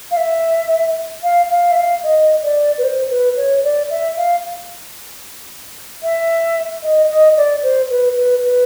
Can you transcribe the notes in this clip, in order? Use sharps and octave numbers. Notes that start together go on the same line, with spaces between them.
F5
E5
F5
F5
E5
F5
D#5
D5
B4
C5
B4
C#5
D5
E5
F5
E5
D#5
D#5
D5
C5
B4
B4
B4